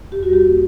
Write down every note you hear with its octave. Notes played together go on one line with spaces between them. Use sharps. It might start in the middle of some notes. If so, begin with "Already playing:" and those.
E2 G4
F#4
G3 G4
A#3